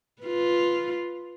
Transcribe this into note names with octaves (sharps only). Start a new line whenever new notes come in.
F4 B4